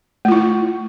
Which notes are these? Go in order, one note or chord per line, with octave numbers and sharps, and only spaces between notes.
A3 E4 F4